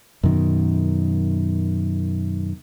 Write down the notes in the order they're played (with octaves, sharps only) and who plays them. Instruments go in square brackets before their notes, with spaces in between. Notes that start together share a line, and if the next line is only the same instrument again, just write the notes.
[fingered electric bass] F#2 B2 D#3